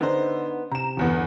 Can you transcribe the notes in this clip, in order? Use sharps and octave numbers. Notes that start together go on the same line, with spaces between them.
D3 B3 D4 D#4 C5
C3 A#5 E7
G1 E2 B3